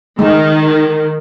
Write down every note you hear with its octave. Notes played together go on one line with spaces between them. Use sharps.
D#3 G#3